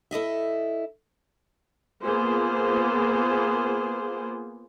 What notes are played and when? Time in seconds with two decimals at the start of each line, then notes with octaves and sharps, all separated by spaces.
0.11 E4 A4 D#5 E5
2.03 A#3 B3 F4 G#4 C5